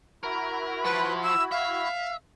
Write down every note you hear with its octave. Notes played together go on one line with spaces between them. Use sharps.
E4 F#4 A#4 B5
F3 B4
E6
E5 F5